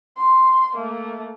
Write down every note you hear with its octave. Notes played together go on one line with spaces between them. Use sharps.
C6
A3 A#3